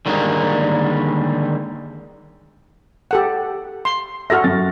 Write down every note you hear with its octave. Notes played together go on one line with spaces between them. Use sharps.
D3 D#3 G3 G#3 A#3
G4 A4 F#5
C6
F#4 A4 E5 F6 A6 A#6
F#2 A6